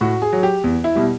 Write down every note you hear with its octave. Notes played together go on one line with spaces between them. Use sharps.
A2 F#4
G#4
F#3
G4
E2
E4
B2 G3